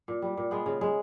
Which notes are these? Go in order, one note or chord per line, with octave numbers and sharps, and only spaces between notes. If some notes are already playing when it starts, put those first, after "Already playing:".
A#2
G3
A#2
G#3 B3
C#3
G#3